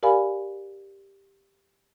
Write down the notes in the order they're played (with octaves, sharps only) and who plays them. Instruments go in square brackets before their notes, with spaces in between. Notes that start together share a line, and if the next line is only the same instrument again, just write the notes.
[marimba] G4 A#4 D5 F5 G#5 B5